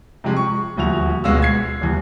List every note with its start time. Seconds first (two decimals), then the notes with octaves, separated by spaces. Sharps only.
0.24 C3 F3 G#3 G4
0.37 C#6
0.77 D#1 D2 F3 F#4 F7
1.24 D1 B2 G#3 F#4 F5 E6
1.42 G#6 C7
1.81 D#1 E2